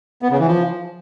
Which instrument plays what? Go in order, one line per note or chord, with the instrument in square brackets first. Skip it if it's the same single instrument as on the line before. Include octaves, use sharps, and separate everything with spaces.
[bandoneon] B3
C#3
E3
F3